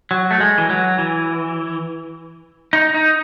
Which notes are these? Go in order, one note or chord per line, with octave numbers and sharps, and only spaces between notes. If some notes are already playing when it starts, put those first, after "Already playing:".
F#3
A3
G#3
E3
F#3
E3
D#4
D#4